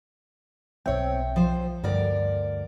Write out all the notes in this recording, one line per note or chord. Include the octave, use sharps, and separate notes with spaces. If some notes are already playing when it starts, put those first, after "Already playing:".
B1 C4 C#5 E5 G5
F3 C5
D2 G2 A#4 D5